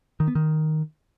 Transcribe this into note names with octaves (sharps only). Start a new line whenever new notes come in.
D#3
B3
D#3